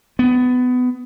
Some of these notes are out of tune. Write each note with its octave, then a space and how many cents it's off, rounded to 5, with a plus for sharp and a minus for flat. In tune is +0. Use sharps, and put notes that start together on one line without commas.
B3 +20